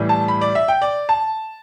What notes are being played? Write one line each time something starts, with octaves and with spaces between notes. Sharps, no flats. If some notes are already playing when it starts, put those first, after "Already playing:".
Already playing: A2 E3 G3
A5
B5
D5
E5
G5
D5
A5